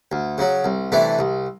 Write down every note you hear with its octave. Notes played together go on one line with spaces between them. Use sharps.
D2
C#3 F#3
C2
C3 E3 A3 D4
C2